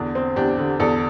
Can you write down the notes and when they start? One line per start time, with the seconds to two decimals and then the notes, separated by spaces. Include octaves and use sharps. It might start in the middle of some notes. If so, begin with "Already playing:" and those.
Already playing: E2 D3 D4
0.15 C4
0.36 E2 D4 G4
0.58 D3
0.80 E2 A4 D5